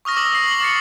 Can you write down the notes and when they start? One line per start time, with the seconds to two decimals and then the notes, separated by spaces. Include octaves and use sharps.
0.05 C#6 D#6 F6 A#6
0.16 D6 E6 A#6 F#7
0.35 C7
0.48 F#7
0.60 D6 F6 A6 C7 C#7